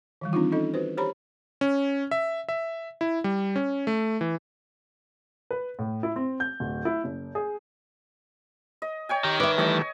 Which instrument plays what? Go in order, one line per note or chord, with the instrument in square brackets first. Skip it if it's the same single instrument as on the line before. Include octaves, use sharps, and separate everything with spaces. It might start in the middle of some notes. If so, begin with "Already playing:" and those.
[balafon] D#3 E3 G3
C4 D4 D#4 F4
C#4 D#4 A4 D#5
F#4 B4 C5
G4 C5 C#5 A#5 B5
[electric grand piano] C#4
E5
E5
E4
G3
C#4
A3
E3
[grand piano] B4
A2
E4
C4
G6
D1
E4
F#1
G#4
[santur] D#5
C#5 G5 G#5
[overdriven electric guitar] D#3 [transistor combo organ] G4 A#5
[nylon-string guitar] B4 E5 [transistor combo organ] D5 D6
[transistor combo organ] E3 G3 A3 [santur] C#5 D#5 G#5